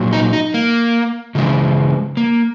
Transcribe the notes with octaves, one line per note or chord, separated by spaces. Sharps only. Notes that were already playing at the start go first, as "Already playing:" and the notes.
Already playing: A#2 F#3
D#4
D#4
A#3
C#3 E3 G#3
A#3